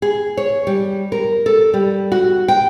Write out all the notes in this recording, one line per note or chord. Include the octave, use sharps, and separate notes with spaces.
G#4
C#5
G3
A#4
A4
G3
F#4
G5